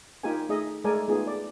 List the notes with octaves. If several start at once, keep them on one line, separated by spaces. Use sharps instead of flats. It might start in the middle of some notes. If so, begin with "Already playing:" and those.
A#3 D#4 F4 G4 A#4 G#5
A3 D#4 G#4 D#5 E5
G#3 A3 A4 A#4 D5 G#5
A3 B3 D#4 F4 G#4
D5